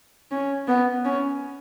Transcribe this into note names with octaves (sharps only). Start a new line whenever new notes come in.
C#4
B3
C#4